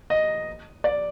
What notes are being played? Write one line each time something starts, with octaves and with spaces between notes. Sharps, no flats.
D#5
D5